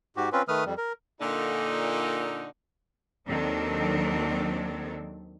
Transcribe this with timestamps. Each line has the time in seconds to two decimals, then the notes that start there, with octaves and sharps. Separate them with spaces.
0.17 G#2 F#4 G4
0.33 C4 C#4 F4 B4
0.48 D#3 A3 B4 D#6 F6
0.66 F2 G3
0.78 A#4
1.20 A#2 D3 D#4
3.28 D#2 D#3 F#3 C4 D4 A4